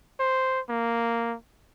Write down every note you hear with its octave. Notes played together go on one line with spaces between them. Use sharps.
C5
A#3